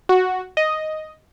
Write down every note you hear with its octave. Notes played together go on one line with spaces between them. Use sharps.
F#4
D#5